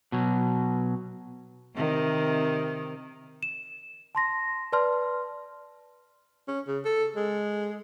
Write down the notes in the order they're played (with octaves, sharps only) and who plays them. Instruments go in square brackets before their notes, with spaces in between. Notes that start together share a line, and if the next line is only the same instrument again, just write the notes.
[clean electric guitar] B2 F#3
[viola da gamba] C3 D#3
[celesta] E7
A5 C6 A#6
B4 D5 A5 C6 F6
[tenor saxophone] C#4
C#3
A4
G#3